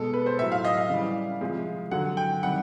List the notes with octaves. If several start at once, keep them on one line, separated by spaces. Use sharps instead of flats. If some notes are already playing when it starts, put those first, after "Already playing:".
Already playing: B2 G#3 A4
B4
C5
A2 F#3 E5
F5
D#5
F5
C#3 E3 G3
C3 F3 G#3
D3 F#3 F#5
G5
C3 D#3 G3 F#5